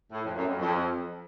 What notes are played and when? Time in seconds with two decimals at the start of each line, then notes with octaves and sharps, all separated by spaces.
0.12 A2
0.24 F2
0.36 F#2
0.47 F2
0.59 F2